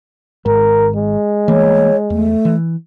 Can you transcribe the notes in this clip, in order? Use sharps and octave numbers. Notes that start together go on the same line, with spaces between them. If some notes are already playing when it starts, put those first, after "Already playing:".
G#1 G#2 A#4
G#3
E3 A3 A#3 C#5
E2 A3
E3